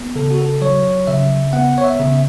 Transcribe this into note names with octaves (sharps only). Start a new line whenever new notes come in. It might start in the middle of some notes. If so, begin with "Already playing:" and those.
Already playing: B3
C#3 A4
F#4
A4
F#3 C#5
C#3 E5
B3 F#5
C#5
E5
C#3